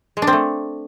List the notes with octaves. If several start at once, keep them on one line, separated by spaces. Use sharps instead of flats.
G#3
D4
C4
A3